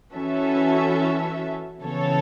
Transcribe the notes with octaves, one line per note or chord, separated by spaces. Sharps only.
E3 C#4 F#4 A4 E5
C#3 E3 B3 A4 C#5